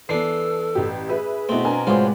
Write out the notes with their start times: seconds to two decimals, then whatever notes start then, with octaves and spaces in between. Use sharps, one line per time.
0.09 E3 B3 D4 A4 C7
0.75 A1 G4
1.09 G#4 B4 E5
1.49 B2 A3 B3 C4 E4
1.65 D4 A#4 G#5
1.87 A2 C3 F#3 G#3 F4 B4 C5 D5